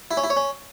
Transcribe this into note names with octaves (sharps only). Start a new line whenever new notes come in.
E4
C#4
E4
C#5
C#4